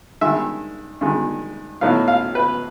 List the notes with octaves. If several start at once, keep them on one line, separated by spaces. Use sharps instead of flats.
G2 D#3 G#3 E5
G2 D#3 G#3
A2 F#3 B3 D#4 F5
F5
B4